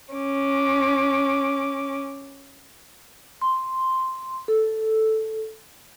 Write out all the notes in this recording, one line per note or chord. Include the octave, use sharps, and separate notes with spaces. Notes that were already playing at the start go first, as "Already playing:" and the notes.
C#4 D6
C6
A4